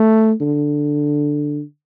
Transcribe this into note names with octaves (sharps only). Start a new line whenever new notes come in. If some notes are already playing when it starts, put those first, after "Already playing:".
Already playing: A3
D3